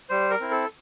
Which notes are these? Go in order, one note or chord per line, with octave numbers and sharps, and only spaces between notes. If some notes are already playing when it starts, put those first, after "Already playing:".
G3 C5
A#4
C4 E4
A4